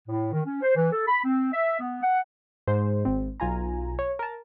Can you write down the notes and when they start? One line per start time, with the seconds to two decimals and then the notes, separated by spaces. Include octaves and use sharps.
0.08 A2
0.32 D#3
0.45 C#4
0.62 C5
0.76 E3
0.92 A4
1.08 B5
1.24 C4
1.52 E5
1.79 B3
2.03 F#5
2.67 G#2 G#3 C5
3.05 G#1 C4
3.40 B1 F4 G#5 A#5
3.99 C#5
4.19 A#4 A5